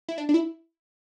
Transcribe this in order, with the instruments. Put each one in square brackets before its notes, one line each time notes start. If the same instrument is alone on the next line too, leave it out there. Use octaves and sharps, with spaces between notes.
[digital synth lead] E4
D4
D4
E4